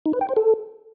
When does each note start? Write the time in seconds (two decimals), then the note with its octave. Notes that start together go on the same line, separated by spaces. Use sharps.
0.06 D#4
0.13 B4
0.21 G5
0.29 C5
0.37 A4